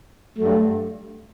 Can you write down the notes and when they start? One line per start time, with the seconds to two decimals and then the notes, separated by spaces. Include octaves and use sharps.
0.37 G2 F#3 A3